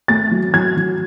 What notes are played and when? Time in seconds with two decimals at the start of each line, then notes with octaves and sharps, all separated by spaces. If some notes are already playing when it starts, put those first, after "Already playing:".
0.08 A3 A6
0.31 F#3
0.54 F#3 G#6
0.77 F#3